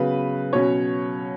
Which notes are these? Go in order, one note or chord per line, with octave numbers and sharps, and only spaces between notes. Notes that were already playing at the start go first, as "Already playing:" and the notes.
Already playing: C#3 F#3 B3 B4
B2 F#3 C#4 C#5